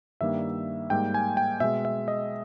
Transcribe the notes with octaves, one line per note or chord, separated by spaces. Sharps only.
G2 D#3 G3 A#3 E5
G#2 G3 A#3 G5
G#5
G5
B2 G#3 E5
E5
D#5